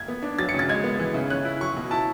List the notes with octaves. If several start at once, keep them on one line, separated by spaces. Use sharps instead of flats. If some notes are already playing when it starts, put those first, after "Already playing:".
Already playing: G#6
B3
D4
F#3 A6
C#7
C#3
A6
G#3 G#6
B3
E3
C#3
C#4 F#6
E4
F#3 C#6
B2
E4 A5